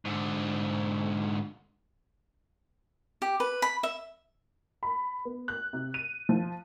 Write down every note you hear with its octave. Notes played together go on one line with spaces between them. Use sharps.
G#2 D3
G4
B4
B5
E5
B5
B3
F#6
C3
D#7
F3